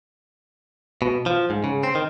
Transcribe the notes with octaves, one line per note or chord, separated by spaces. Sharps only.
B2
F3
G#2
C#3
C4
D#3